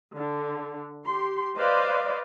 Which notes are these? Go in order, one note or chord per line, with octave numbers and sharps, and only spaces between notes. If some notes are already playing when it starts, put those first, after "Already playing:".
D3
G4 C6
B4 C5 D5 D#5 F5